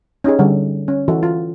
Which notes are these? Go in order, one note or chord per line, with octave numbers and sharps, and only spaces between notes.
C#4 D#4 G4 G#4
D3 G3
C#4
E3 F#4 A4
F4